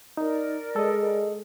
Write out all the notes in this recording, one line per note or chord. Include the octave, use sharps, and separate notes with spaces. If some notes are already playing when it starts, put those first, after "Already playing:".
D#4 A#4 D5
G#3 A4 D#5